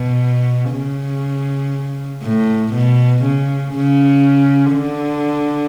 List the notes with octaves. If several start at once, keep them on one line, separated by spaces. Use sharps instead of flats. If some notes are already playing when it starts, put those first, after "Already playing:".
Already playing: B2
C#3
A2
B2
C#3
C#3
D3